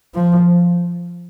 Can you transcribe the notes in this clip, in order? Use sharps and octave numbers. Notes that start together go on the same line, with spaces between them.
F3